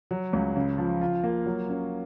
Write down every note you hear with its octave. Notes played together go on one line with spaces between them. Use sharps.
F#3
C#2
C#3
F3
F4
A#3
F#3
C#4